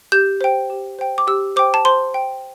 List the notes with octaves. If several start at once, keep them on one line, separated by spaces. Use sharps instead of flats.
G4 G6
C5 G5
G4
C5 G5
D6
G4 E6
C5 G5 D6
A5
C5 C6
G5